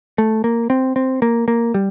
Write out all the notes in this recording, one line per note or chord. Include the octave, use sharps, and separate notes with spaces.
A3
A#3
C4
C4
A#3
A#3
G3